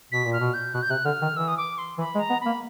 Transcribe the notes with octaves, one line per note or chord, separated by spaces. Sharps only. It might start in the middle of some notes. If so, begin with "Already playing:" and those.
B2 B6
A#2
F6
B2
G6
B2 F#6
G6
C3 F#6
D3 F6
D#3
E3 E6
D#6
D6
C6
E3 B5
G#3
A#5
B3
A#3 B5